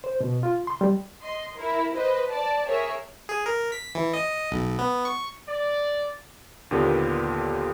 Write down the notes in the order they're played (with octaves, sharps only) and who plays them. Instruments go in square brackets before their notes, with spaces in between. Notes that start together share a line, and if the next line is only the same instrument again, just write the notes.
[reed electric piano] C5
B2
F4
C6
G3
[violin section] D#5 C6
E4 A#4
B4 C5 D#5
D5 A5
G#4 A#4 C#5 E5
[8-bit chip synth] G#4
A#4
B6
E3
D#5
B1
B3
C#6
[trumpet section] D5
[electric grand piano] D#2 A#2 D3 B3 G4